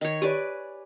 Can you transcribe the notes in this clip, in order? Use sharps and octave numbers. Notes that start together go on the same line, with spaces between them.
D#3 C#5
G4 B4 C#5 D5 G#5